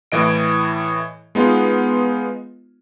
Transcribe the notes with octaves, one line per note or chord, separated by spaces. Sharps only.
A2 E3 D#5 D7
G#3 B3 D#4 F4